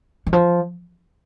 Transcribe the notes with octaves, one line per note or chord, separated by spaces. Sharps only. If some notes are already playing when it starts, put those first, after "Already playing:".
D#3
F3